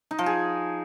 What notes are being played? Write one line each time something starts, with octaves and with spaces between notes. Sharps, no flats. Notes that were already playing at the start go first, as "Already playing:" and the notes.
D#4
F3
G#4